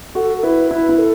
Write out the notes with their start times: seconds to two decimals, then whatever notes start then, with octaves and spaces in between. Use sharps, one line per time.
0.15 F#4 A4
0.37 A4
0.43 E4 B4
0.71 E4 B4
0.89 E4
0.98 A4